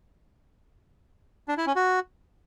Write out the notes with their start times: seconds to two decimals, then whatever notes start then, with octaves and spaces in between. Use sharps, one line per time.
1.48 D4
1.57 E4
1.66 C#4
1.76 F#4